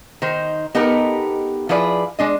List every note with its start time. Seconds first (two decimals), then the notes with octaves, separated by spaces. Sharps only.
0.22 D#3 D#4 C5
0.75 B3 D#4 G4 A4 A#4
1.69 F3 E4 G#4 B4 D5
2.19 G#3 D4 D#5